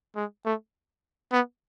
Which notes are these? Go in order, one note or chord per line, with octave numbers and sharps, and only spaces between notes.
G#3
A3
B3